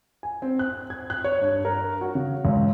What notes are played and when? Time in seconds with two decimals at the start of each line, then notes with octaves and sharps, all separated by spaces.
0.23 G#5
0.42 C4
0.59 F#6
0.90 G#6
1.10 F#6
1.24 C#5
1.41 G2
1.65 A#4
2.01 F#4
2.15 C#3
2.45 C#2